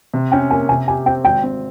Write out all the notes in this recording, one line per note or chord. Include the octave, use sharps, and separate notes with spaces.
C3
C#4 G5
A#3 G#5
C3 G#5
G4 G#5
C4 G5
G#1 G5
C4